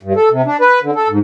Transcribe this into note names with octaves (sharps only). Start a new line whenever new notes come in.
G2
A4
C3
D4
B4
D3
A4
G#2